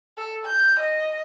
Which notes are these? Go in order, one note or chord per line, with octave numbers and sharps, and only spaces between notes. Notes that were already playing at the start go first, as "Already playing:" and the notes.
A4
G6
D#5